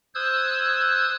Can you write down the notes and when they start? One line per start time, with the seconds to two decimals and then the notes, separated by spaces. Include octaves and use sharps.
0.15 C5 D#6 E6 F#6 G#6